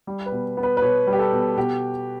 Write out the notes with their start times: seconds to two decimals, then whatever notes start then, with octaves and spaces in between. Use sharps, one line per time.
0.07 G3
0.26 B4
0.32 B2
0.57 B3
0.63 B4
0.77 B4
0.82 B2 C#5
1.07 G3
1.13 G4
1.19 A4
1.32 B2
1.57 B2 G4